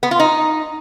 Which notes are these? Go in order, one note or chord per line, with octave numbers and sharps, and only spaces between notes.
B3
F4
D#4